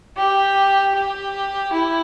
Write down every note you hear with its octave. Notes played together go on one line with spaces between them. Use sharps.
G4
G4
E4